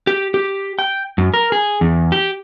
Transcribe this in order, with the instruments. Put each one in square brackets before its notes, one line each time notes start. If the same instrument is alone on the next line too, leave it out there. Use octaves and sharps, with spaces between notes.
[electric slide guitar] G4
G4
G5
F#2
A#4
G#4
E2
G4